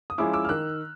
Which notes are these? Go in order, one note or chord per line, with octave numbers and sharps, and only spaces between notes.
D#6
F3 G#3 C#4 E4 D6 E6
D6 E6
F6
D#3 E6 F#6